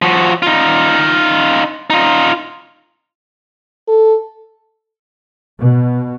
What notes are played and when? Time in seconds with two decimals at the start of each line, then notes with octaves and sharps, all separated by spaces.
0.02 F3 F#4
0.42 D#4 F4
1.90 D#4 F4
3.88 A4
5.58 B2